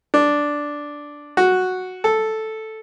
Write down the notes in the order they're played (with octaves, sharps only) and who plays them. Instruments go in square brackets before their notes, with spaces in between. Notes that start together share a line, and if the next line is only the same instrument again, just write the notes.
[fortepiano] D4
F#4
A4